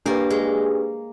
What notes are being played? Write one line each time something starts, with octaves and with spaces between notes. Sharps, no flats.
A#3 D4 G4 B4
G#3